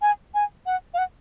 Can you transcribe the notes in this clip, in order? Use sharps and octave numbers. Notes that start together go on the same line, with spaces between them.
G#5
G#5
F#5
F5
F#5